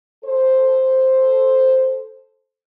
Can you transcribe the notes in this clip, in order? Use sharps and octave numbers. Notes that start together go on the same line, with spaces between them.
A4 C5